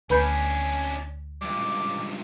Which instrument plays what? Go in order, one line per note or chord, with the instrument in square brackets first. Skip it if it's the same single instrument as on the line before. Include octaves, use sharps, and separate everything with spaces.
[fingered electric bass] D2 [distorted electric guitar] C#4 D4 [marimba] B4 B5 G6 [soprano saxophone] G#5
[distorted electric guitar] C#2 G2 [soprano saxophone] D6